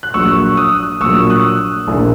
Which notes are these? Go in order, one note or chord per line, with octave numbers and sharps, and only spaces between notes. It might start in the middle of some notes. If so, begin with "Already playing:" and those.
F#6
A#1 A#2 F#3 C#6 E6
D#6 F#6
A#1 A#2 F#3 C#6 E6
D#6 F#6
A#1 A#2 A#3 E4